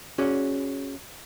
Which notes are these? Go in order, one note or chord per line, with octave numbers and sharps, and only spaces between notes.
C#4 F#4 G#4 D5